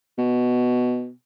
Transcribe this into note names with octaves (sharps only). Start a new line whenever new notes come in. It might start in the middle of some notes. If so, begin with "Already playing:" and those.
B2